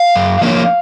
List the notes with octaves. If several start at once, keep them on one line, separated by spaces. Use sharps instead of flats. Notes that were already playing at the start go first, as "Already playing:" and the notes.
Already playing: F5
F#2
F3 A#3 C#4